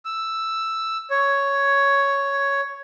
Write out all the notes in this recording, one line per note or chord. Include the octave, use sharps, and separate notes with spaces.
E6
C#5